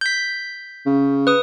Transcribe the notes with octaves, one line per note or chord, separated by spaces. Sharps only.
G6 B6
C#3
B4 D#6